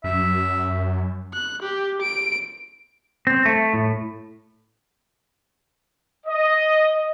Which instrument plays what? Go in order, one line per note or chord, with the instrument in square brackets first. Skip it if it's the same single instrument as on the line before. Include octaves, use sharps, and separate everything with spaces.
[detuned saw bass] F#2 [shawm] E5
[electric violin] F#6
G4
D7
[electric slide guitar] C4
A3
A2
[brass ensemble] D#5